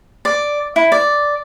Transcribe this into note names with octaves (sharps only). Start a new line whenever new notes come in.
D5
E4
D5